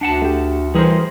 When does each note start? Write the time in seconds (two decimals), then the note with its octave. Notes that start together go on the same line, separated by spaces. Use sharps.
0.01 D2 D4 F#5 A5
0.22 A3 G4
0.75 E3 G3 G#4 A#4 C5